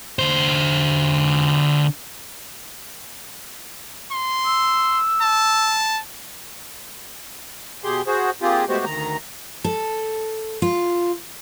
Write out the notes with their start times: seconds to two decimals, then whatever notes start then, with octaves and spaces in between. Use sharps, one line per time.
0.19 D3 C5
4.12 C6
4.46 E6
5.22 A5
7.84 B2 G4 G#4 C6
8.07 F#4 G#4 C5
8.42 A#3 C4 F4 G4 G#4
8.69 G#3 A3 B3 F#4 G4 C5
8.85 D2 D#3 A#5
9.64 A4
10.62 F4